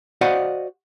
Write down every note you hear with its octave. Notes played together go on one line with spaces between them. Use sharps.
F#4 C5 D5 D#5 F5 F#5